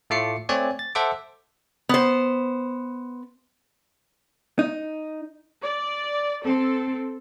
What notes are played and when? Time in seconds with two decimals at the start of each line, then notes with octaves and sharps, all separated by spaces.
0.10 A2 A3 F4 D6 C7 C#7
0.49 A3 C4 C#5 D5 G#5
0.79 A6
0.95 A4 C5 E5 F#5 D6
1.89 B3 C5
4.59 D#4
5.62 D5
6.45 C4 A4